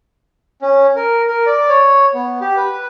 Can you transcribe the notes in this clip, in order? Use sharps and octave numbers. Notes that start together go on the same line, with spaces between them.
C#4
A#4
A#4
D5
C#5
B3
G4
B4